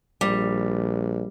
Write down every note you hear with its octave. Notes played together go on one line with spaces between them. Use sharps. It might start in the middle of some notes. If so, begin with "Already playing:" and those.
A#1 G3